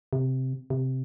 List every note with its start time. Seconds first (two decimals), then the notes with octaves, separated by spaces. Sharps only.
0.13 C3
0.70 C3